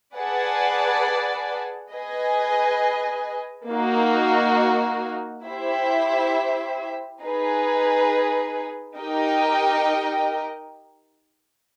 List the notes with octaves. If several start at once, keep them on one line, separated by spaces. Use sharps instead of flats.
G#4 B4 D5 F#5 A5
G#4 B4 D#5 G#5
A#3 D#4 F#4
E4 G4 C5 E5
D#4 G#4 B4
D#4 G4 A#4 D#5 G5